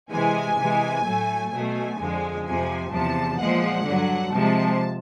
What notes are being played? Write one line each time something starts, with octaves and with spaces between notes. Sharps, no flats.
C3 E3 G#3 G#5
C3 E3 G#3
A2 F#3 A3
B2 F#3 A3 G#5
F2 D3 F3 G#3
F2 C3 F3 G#5
E2 C3 F3 A5
A#2 F3 G#3 F#5
G2 D3 F#3
C3 F3 G#3 A5